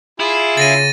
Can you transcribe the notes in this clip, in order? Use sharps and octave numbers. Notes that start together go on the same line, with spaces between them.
E4 F4 G#4
C#3 A6 A#6 D#7